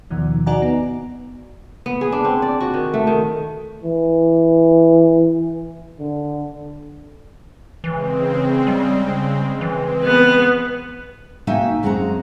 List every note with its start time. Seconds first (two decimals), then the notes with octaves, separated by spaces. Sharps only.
0.10 D#2 B2 D#3 F3
0.46 D#4 F#4 D5 F#5 G#5 A#5
0.62 B3
1.86 B3
2.01 G#4
2.12 D4
2.25 C4
2.42 D5
2.61 F#4
2.74 D#3
2.94 A3
3.07 D#3
3.83 E3
5.99 D3
7.84 C#3 E3 G#3 C4
8.67 G3
9.61 E3 G#3 C4
10.04 B3 C6
11.47 A#3 D#4 F#4 E5 G5 G#5
11.83 F#2 G#3 C4 F#5 A5 A#5